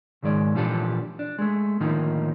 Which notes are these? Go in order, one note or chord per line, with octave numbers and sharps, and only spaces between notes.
C#2 G#2 D#3 G#3 D5
A#2 E3 F3 D4 G4 A4
D4
G#3 A3
A2 D3 D#3 F3 A#3 D#4